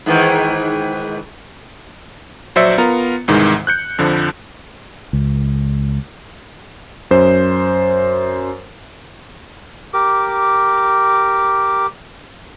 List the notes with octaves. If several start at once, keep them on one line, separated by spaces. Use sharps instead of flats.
G#2 D#3 E3
A#1 F#3 C5 D5 E5 C#7
B3 F4 A#4 A#5
C2 G#2 D#3 E3 G#3
F#6 G6 C#7
F2 D3 F3
C#2
F#2 C5
G4 A#4 D6